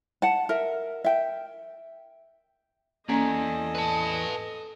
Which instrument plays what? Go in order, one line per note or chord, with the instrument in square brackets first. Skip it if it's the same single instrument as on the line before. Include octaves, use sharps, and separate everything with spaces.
[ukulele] F#5 A5
A#4 E5
E5 G5
[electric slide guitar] E2 D5 G#5 [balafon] A#3 C#4 A#5 [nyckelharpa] A4 D#5
[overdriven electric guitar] B4 A5